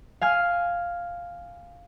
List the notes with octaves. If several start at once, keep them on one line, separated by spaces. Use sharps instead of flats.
F5 G#5 F6